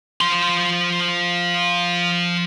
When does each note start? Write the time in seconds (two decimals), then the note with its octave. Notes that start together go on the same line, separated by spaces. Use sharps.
0.21 F3 C6